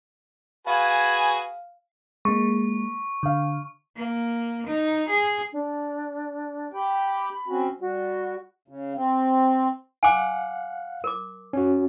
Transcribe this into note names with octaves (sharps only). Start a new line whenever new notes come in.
F#4 G#4 B4 F5 G#5
G#3 A#3 C#6
D3 F5
A#3
D#4
G#4
D4
G4 G5 B5
C4 C#4 F#4
G3 F#4
C#3
C4
F5 F#5 G#5 D6
A#4 D6
C#4 F#4